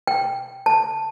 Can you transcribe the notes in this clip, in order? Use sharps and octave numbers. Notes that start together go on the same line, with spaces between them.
G5
A5